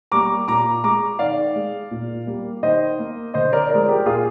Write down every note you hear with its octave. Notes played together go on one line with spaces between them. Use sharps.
G3 A#3 A#5 D6
A#2 A#5 D6
G#3 A#5 D6
D#3 D5 F5
G#3
A#2
G3 A#3
D#3 C5 D#5
A#3
D3 C5 D#5
A#4 D5
F3 G#3 A#4 D5
G4 A#4
A#2 F4 G#4